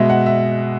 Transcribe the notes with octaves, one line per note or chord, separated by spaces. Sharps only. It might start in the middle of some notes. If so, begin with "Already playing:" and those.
Already playing: B2 G#3 E5
F#5
E5